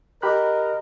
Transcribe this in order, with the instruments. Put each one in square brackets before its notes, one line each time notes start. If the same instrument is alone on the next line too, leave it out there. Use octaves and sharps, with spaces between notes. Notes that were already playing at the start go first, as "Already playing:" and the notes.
[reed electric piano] G4 B5 F#6 [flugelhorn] A#4 [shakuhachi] D#5